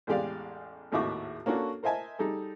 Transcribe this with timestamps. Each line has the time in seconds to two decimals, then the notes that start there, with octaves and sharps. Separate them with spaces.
0.07 A1 E2 G#3 G4 D5 F5
0.92 G#1 D#2 A2 F#4 E5 D6
1.46 A#3 C#4 D4 F#4 A4
1.83 A#4 C5 D#5 E5 G#5 A5
2.19 G3 D#4 G#4 A4